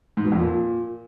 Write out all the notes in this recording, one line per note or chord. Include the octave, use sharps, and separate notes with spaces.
G#2
B2
F2
A#2